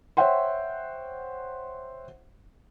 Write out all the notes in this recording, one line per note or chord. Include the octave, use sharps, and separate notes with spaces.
C5 C#5 E5 F#5 G5 C6